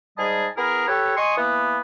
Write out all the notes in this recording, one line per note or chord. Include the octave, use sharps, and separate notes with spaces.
G#2 G3 G#4 D#5 A5
B3 E4 G#4 A#4
G4 A4 B4 C#5
D#5 G#5 C6 C#6 D#6
E3 A#3 B3